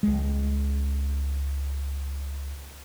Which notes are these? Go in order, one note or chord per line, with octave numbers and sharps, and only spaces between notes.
C#2 G#3